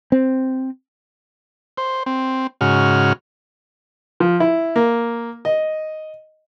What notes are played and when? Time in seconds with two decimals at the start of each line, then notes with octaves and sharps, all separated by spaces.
0.12 C4
1.78 C5
2.06 C4
2.61 G#2 C#3 F#4 F6
4.20 F3
4.40 E4
4.76 A#3
5.45 D#5